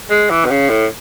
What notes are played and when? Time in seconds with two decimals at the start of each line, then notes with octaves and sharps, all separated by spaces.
0.10 G#3
0.30 E3
0.45 B2
0.51 C#3
0.70 A2